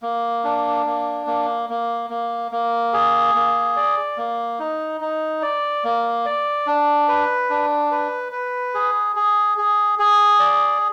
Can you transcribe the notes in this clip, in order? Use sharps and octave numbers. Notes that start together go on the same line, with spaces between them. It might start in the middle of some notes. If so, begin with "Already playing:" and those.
A#3
D4
A#3
A#3
A#3
A#3
A#3
G#4
A#3
D5
A#3
D#4
D#4
D5
A#3
D5
D4
B4
D4
B4
B4
G#4
G#4
G#4
G#4
D5